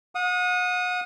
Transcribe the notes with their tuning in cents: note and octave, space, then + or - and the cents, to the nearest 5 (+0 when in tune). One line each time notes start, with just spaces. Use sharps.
F#5 -40 D#6 +0